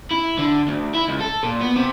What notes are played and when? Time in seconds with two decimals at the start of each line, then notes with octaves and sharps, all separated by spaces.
0.11 E4
0.39 D3
0.68 D2
0.94 E4
1.08 C#2
1.20 A4
1.43 A#2
1.61 B3
1.76 C3